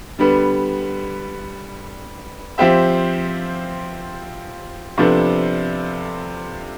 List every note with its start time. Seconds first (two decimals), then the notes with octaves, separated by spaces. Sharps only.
0.19 D3 G3 B3
2.58 F3 C4 G4 C5 E5
4.98 C3 F3 B3 D4 A4